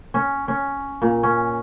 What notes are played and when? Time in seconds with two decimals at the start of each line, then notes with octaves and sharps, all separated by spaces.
0.14 C#4
0.48 C#4
1.02 A#2
1.23 C#4